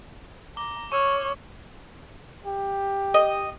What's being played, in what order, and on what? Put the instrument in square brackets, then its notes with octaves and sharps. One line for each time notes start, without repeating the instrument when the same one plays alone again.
[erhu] A#5 [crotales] D6 G7
[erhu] C#5 [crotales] C#6 E6 F6
[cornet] G4
[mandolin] D#5